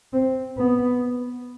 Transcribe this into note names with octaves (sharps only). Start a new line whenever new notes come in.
C4
B3